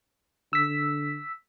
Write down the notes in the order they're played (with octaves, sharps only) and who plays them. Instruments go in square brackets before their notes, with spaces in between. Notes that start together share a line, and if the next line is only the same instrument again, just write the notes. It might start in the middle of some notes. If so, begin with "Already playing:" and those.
[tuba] D3 [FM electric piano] E6 B6